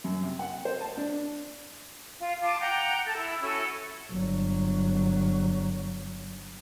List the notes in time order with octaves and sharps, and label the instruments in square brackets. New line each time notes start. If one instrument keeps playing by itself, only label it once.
[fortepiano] F#2
C3
F#5
C5
A5
D4
[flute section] F4
F4 A5 D6
F#5 G5 A#5
A4 A5
E4
C#4 E4 F#4 A4
[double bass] G1 F#3